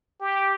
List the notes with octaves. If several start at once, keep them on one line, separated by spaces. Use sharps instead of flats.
G4